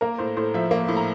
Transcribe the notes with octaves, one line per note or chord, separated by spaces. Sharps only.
A#3 A#4
A2 C5
A2 C5
F3 E5
A#3
A2
A#5